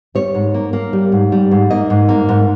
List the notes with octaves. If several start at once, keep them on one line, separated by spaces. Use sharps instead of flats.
G3 C#5
G#2
A#3
A#3
G3
G#2
G3
G#2
A#3 D#5
G#2
A#3
G#2